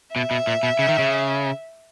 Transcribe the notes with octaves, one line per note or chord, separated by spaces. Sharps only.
B2 E5
B2
A#2
B2
C#3
D#3
C#3